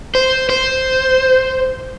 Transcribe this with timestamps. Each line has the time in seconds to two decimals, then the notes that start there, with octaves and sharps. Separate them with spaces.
0.15 C5
0.50 C5